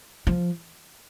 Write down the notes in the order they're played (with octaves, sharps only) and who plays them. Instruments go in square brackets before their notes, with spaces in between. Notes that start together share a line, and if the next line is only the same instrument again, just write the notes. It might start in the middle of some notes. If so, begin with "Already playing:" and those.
[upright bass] F3